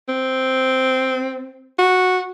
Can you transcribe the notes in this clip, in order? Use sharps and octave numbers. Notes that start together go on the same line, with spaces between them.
C4
F#4